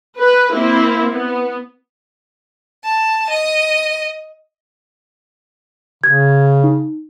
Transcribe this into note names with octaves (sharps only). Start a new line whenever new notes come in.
B4
A#3 C4 E4
B3
A5
D#5
C#3 G#6
D#4